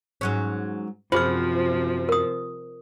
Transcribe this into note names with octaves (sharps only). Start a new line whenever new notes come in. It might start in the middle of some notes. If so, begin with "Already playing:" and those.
G#2 F#3 C#4
F#2 C3 F3 F4 G#4 C5 F6
A#4 D#6